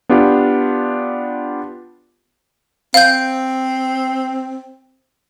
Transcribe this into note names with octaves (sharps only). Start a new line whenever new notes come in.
B3 D4 F4 G4
C4 F5 G6